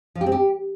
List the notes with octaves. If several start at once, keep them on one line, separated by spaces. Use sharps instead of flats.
F3
G4
C4
G4